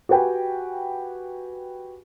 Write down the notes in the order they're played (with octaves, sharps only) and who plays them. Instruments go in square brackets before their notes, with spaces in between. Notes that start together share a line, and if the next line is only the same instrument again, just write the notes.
[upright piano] F#4 G4 B4 G5 G#5